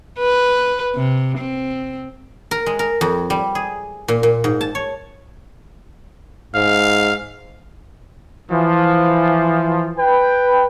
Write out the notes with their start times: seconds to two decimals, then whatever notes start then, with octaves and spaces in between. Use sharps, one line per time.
0.19 B4
0.95 C3
1.38 C4
2.51 A#4
2.66 G#3
2.79 A#4
3.01 F2
3.30 G3
3.55 G#4
4.08 A#2
4.23 A#2
4.44 G#2
4.61 A5
4.75 C#5
6.55 G#2 F5
8.51 E3 F3
9.98 B4 G5